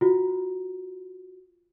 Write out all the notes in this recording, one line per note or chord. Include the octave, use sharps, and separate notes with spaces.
F4 F#4